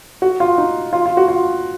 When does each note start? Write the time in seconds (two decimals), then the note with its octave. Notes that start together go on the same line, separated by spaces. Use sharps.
0.22 F#4
0.40 F4
0.58 D#4
0.93 F4
1.06 F4
1.17 F#4
1.28 F4